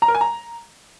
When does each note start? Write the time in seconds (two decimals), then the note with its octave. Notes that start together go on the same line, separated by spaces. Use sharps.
0.02 A#5
0.08 A#4
0.15 G#5
0.21 A#5